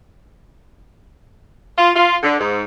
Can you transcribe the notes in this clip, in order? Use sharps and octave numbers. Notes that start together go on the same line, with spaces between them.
F4
F4
D3
G#2